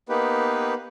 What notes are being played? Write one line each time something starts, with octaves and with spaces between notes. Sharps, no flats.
A#3 B3 D#4 G4 B4